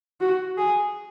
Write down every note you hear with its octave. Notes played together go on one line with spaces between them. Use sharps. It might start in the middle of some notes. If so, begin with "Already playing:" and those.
F#4
G#4